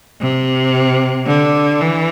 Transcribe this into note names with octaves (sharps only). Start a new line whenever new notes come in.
C3
D3
E3